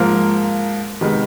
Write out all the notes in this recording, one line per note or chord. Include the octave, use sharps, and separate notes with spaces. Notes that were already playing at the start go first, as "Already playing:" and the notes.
Already playing: G#2 F3 A#3
C3 D#3 G#3 B3